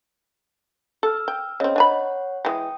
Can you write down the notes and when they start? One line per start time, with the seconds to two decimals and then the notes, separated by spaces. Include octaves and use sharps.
1.03 A4 E6 F6
1.28 G5
1.60 C#3 C4 C#5 D#5
1.76 D4 C#5 F#5 G#5 B5
2.45 E3 G#3 G5 D#6